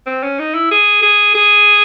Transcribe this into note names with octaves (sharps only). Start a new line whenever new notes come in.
C4
C#4
D#4
E4
G#4
G#4
G#4